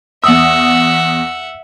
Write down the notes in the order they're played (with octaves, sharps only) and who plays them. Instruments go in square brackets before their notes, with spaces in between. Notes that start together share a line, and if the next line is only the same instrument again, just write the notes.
[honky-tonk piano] E2 D#6 [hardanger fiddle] E5 F#5 [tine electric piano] E6